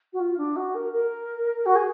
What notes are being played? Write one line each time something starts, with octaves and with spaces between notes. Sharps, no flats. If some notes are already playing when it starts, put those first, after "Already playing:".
F#4
F4
D4
F#4
A#4
A#4
F#4
G#4